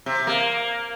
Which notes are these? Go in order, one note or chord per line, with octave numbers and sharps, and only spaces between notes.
C3
A#3